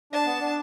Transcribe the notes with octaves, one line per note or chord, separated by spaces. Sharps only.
D4 A5
B3
D4